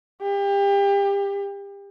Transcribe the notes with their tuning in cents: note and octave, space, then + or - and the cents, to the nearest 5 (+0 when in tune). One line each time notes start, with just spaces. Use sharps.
G4 +30